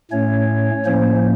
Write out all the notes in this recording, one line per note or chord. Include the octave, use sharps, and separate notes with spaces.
A2 A3 C#4 C#5
A2 F3 A#3 C#4 C5